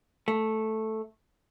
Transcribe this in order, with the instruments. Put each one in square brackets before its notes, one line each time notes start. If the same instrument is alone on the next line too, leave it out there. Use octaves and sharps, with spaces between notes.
[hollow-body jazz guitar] A3